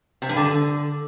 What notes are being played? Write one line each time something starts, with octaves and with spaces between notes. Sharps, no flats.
C3
G2
D3